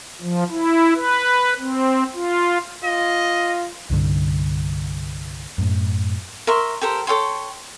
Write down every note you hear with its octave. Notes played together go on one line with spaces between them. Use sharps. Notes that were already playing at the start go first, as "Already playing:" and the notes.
F3
E4
B4
C4
F4
F4 D#5
C2 G2 D3
F#2 A2
A#4 E5 C6 C#6
G4 A4 A#4 C5
A4 C#5 G5 C6